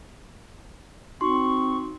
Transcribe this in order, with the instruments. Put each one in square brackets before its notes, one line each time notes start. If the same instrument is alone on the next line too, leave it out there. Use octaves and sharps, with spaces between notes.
[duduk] C4 [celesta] D#4 F#4 [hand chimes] C6 [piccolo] C#6